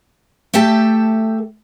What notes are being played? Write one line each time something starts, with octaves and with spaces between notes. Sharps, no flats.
A3 G4 A4 E5 G5 A5